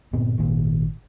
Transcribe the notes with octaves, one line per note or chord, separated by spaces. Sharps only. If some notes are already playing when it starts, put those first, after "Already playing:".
G1 A#2 B3 C4
G#1 A#2 D#3